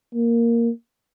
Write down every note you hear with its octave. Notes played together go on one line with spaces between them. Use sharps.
A#3